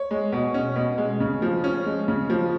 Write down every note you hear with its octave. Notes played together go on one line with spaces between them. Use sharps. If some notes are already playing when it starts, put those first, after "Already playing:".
Already playing: C#5
G#3
B2
C#4
B2
G#3
C#3
F3
C#4
G#3
C#3
F3